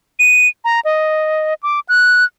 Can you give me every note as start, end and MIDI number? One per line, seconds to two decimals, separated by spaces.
0.19 0.47 99
0.65 0.80 82
0.85 1.54 75
1.63 1.80 86
1.89 2.24 90